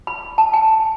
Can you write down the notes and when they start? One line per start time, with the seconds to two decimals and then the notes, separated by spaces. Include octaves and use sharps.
0.07 B5
0.38 A5
0.53 G#5